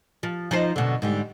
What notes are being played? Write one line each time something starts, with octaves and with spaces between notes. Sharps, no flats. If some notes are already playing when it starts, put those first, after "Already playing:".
F3
F3 D#4 C5
F#2 B2 D3
G#2 D3 G3